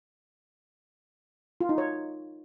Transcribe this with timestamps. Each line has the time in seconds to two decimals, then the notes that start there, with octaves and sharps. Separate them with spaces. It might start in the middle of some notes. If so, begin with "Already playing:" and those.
1.61 F4
1.69 D#4
1.78 C#5